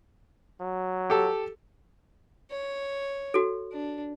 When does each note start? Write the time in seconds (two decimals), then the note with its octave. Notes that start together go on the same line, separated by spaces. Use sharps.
0.60 F#3
1.10 G4 A4
2.51 C#5
3.34 F#4 A4
3.72 D4